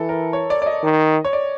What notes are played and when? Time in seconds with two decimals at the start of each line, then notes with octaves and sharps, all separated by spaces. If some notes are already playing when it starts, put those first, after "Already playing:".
Already playing: E3 A4
0.09 A#4
0.33 C#5
0.50 D5
0.62 D5
0.66 D#5
0.83 D#3
1.25 C#5
1.33 D5